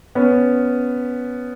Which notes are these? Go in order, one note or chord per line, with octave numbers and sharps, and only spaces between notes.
B3 C#4